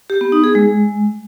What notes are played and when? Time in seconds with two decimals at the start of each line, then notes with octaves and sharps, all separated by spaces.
0.10 G4
0.21 B3
0.32 D#4
0.44 G#4
0.55 G#3